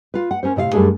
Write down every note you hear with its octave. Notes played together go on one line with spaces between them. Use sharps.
F4 B4
F#5
C#4 A#4 C5
A2 C3 D#5 F5
F#2 G3 A3 D4 G#4